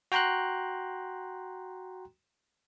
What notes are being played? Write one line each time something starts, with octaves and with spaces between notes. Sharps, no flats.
F#4 G5 A#5 C6 F#6